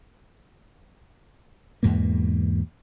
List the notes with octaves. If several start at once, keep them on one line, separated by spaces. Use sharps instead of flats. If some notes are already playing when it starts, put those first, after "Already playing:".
E2 G#2 B2 A#3